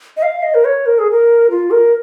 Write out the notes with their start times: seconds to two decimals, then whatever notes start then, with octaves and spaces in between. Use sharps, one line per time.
0.17 D#5
0.22 F5
0.43 D#5
0.54 A#4
0.65 C#5
0.86 A#4
0.99 G#4
1.11 A#4
1.50 F4
1.71 A#4